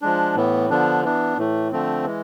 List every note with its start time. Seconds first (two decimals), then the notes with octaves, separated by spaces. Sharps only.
0.02 F3 G#3 D4
0.36 A2 E3 B3
0.70 D3 F3 B3 D4
1.03 E3 B3 D4
1.38 A2 E3 A3
1.72 D3 F3 A3 C4
2.05 E3 G#3